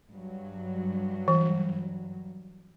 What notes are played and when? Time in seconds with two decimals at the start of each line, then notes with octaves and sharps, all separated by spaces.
0.10 G2 F#3
1.28 E3